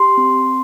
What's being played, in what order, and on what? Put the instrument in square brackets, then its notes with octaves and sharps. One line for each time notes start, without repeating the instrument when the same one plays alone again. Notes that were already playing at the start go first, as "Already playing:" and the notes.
Already playing: [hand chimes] G4 C6
C4